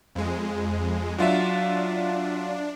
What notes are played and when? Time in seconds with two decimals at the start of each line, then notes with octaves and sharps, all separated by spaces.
0.15 F2 G#3
1.18 F#3 D4 F4 E5